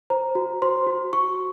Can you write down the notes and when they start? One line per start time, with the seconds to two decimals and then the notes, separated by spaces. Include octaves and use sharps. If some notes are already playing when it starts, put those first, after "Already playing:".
0.10 C5 A#5
0.35 F#4
0.62 C5 C6
0.87 F#4
1.13 F#4 C#6